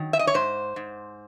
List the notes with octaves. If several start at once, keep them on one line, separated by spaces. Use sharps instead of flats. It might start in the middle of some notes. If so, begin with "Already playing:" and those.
Already playing: D#3 F#3
E5
D#5
C#5
G#2 C5
G#2